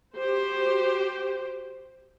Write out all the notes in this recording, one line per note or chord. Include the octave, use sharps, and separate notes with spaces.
F#4 G4 C5